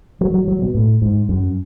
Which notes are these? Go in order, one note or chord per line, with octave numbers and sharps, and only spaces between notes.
F#3
F#3
F#3
B2
A2
G#2
F#2